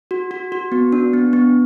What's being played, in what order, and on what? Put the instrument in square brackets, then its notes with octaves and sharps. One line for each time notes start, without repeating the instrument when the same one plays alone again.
[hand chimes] F#4
F#4
F#4
B3
D4
B3
B3